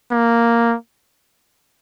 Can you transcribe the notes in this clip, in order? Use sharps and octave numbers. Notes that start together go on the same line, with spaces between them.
A#3